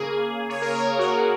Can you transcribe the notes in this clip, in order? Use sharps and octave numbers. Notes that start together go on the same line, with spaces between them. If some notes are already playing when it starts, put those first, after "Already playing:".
Already playing: C#3 A#3 G#4
C#5
A#4
G#4
F#4